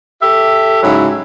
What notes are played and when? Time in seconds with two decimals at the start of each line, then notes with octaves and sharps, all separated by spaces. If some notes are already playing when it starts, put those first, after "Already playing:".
0.23 G4 A4 E5
0.83 G#2 C#3 F#3 E4